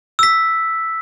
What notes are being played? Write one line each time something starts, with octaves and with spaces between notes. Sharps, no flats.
E6 B6